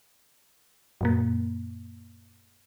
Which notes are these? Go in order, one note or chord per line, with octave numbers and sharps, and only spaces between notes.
F#2 A#2 A#3